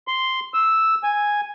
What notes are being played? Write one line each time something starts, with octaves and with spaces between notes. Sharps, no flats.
C6
E6
G#5